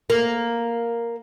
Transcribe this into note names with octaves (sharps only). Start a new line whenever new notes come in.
A#3